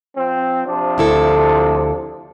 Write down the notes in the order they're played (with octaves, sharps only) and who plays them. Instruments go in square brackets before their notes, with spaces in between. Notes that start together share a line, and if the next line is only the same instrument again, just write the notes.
[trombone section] F3 C4
C3 F3 D4
[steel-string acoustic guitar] D2 E4 A4